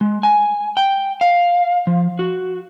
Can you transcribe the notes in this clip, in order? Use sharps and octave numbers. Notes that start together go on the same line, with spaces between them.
G#3
G#5
G5
F5
F3
F#4